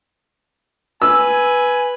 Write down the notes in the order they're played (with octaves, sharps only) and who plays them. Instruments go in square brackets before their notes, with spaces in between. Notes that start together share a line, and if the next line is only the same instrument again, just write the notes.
[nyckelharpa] B4 [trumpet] G#5 [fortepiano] E6